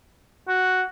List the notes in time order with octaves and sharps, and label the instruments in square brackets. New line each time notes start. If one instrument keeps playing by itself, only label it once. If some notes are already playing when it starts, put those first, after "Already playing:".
[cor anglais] F#4